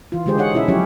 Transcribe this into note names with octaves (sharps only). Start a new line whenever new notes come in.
E3 F4
D3 G#3 G4 G#4 C5
D#4 G#4 C#5 F#5
B2 C#4 E4 A4 E5
F3 F#3 C#4 E4 G4 C#5